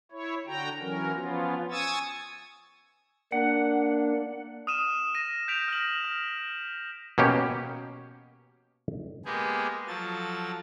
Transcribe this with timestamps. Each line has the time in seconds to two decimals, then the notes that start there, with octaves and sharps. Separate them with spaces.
0.12 E4 C#5
0.47 D3 F#4 G5 A#5
0.80 E3 F#3 C#4 A#4
1.13 F3 B3 C#4 F4
1.71 G#5 C#6 D#6 E6 G#6 A6
3.32 A#3 D4 F#5
4.67 D#6 F6 D#7 E7
5.15 A#6 D#7
5.48 G6 B6 D7 F7
5.68 F6 A#6 E7 F#7
6.04 F6
7.18 B2 A#3 C#4 G4
9.25 G#3 A#3 B3 G4 G#4
9.88 F3 F#3 A4 A6